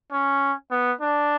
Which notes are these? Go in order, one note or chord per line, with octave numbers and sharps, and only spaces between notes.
C#4
B3
D4